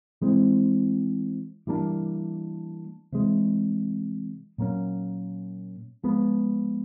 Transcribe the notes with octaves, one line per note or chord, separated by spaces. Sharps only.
E3 G#3 C4
E3 G3 A#3 D4
C3 E3 G#3
A#2 F#3 A#3 C#4
F3 G#3 B3